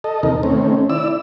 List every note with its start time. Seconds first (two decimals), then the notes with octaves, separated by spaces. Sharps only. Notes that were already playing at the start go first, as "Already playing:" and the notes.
0.04 A4 D#5
0.23 D#2 C3 D#4 A#4
0.43 D#3 A3 C4 C#4
0.90 E4 D5 E6